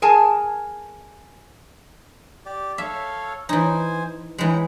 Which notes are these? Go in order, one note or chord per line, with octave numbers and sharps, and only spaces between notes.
G#4 A#4 G#5 A5
G4 D5
A4 C#5 E5 F5
E3 D#4 C5 G#5
E3 G#3 G5 A#5